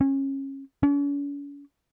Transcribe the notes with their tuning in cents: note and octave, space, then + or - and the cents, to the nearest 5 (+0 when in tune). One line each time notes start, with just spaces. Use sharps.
C#4 -25
C#4 +45